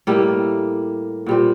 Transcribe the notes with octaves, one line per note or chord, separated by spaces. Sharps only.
A2 G3 A#3
A#2 G3 C4